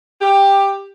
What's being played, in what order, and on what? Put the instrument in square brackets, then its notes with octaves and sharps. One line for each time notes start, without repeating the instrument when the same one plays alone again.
[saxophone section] G4